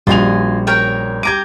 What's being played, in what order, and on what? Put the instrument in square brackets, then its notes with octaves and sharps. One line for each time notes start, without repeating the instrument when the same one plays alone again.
[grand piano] A#1 F7 [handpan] G3 C#4 F#4 [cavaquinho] F4 D#5 G#5
[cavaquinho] A#4 C#5 G5
[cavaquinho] G4 A#5 D6 [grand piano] G#6 D#7